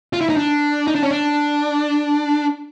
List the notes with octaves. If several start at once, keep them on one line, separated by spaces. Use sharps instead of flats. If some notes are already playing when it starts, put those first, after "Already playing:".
F4
E4
D#4
D4
D#4
D4
C#4
D4